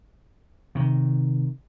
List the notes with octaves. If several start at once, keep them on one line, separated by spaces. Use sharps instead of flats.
C3 D#3